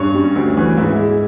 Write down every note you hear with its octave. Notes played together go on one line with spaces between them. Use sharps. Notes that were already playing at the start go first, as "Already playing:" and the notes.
Already playing: G2 C#4 C#5
G3
D2
E3
G#2 E4 E5
G#3